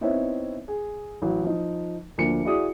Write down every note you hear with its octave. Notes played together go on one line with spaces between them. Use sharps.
B3 C4 D#4 E4 C#5 E5
G#4
A1 F#3
F3 D#4
D2 F3 A#3 D4 C#7
E4 F#4 G#4 D5 D#6